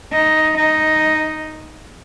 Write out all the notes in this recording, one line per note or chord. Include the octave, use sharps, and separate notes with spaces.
D#4
D#4